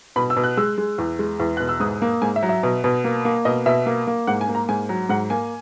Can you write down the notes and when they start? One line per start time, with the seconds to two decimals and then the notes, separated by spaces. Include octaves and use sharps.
0.16 B2 B5
0.30 E6
0.36 B2
0.44 F#6
0.57 G#3 E6
0.78 G#3
0.98 E2
1.19 G#3
1.40 E2
1.57 B2 F#6
1.69 E6
1.80 G#2 D#6
2.02 A#3
2.22 G#2 G#5
2.36 E5
2.43 F#3
2.49 E5
2.63 B2
2.84 B2
3.04 A#3
3.25 A#3
3.45 B2 D#5
3.66 B2 E5
3.86 A#3
4.07 A#3
4.27 G#2 F#5
4.41 G#5
4.48 A#3
4.55 A#5
4.69 G#2 G#5
4.89 F#3
5.09 G#2 F#5
5.30 A#3 G#5